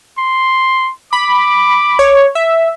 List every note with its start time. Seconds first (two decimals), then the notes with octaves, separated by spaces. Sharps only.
0.18 C6
1.13 B5 D6
1.99 C#5
2.35 E5